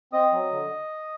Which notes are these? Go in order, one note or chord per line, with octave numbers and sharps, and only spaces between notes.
C4 D#5 D#6
F#3
D3